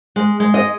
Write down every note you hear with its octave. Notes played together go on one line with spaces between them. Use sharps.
G#3
G#3
D#5